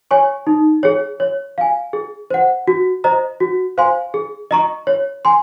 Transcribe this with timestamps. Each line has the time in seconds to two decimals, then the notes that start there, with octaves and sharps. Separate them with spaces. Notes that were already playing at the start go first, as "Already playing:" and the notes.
0.11 C#5 G#5 C#6
0.47 D#4
0.83 G#4 C#5
1.20 C#5
1.58 F5 G#5
1.93 G#4
2.30 C5 F#5
2.67 F#4
3.04 C5 D#5 A#5
3.40 F#4
3.78 C5 F5 G#5 C6
4.14 G#4
4.51 D#5 A#5 C#6
4.87 C#5
5.25 G#5 C6